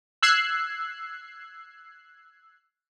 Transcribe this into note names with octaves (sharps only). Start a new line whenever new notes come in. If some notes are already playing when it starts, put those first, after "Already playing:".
E6 F#6 G#6 C7